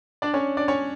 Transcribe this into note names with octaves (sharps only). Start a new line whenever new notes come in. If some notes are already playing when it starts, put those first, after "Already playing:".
D4 D5
C#4 C#5
D4 D5
C#4 C#5